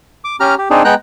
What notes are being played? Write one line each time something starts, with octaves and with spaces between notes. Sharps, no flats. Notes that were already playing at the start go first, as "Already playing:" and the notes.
D6
C#4 G4 A#5 F6
G4
C4 D4 D#4 G#4
G#3 B3 G5 A#5 F#6